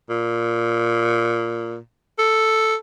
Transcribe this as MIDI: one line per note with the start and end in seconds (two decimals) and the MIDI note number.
0.10 1.78 46
2.19 2.75 69